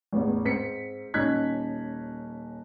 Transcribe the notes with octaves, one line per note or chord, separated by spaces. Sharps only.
A1 E2
G#2 C4 B6 C#7
D#1 C#4 D#4 F#6 G#6 B6